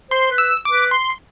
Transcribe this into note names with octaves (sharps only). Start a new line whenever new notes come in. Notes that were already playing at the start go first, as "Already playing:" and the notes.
C5 C6
B4
E6
D6
B4
C6